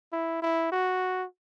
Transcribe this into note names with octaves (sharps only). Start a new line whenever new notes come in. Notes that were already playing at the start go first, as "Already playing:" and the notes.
E4
E4
F#4